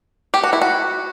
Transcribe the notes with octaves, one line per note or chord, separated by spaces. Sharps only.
G4
F#4
E4
F#4